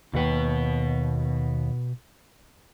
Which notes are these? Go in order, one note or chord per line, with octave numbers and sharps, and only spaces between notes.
D#2 B2 B4 F#5 G5